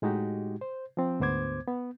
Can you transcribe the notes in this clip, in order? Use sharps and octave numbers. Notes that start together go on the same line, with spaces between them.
A2 G#3 D#4 F#4 G4
C5
F3 C4
D2 G#2 B3 C5 D6 G#6
B3